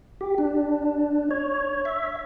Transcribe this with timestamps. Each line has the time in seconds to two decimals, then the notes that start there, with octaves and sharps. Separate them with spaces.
0.21 G4
0.38 D4
1.31 C#5
1.85 E5